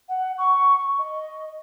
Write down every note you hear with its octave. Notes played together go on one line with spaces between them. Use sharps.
F#5
C#6
D#5